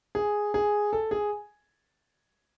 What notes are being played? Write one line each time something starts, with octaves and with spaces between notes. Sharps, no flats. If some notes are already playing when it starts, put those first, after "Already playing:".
G#4
G#4
A4
G#4